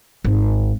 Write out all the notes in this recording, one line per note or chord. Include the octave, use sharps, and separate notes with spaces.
G#1